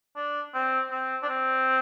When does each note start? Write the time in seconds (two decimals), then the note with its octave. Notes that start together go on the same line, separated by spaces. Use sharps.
0.16 D4
0.54 C4
0.91 C4
1.23 D4
1.29 C4